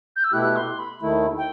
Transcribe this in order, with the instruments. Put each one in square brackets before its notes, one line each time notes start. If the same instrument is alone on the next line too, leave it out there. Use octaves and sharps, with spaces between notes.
[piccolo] G6
E6
[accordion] B2 A3 E4 G4 [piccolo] F#6
[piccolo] C6
B5
[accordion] D#2 D#3 A3 E4
[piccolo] G5